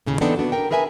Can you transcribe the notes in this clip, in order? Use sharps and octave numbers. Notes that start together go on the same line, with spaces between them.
D#2 A2 C#3
E3 B3 C4 D4 D#4 A4
B3 D4 F#4
A#4 G5
G#4 A#4 B4 E5 G5 G#5